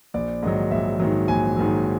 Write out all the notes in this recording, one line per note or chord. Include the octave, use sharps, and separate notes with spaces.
A#1 D5
G#2 D#3 F#3 D#5
A#1 E5
G#2 D#3 F#3
A#1 G#5
G#2 D#3 F#3